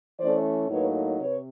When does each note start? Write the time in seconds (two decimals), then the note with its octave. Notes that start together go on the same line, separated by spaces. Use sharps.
0.20 E3 A3 C#4 C5 D5
0.70 A2 F#3 A#3 D#4 B4 C#5
1.20 C3 B4 C#5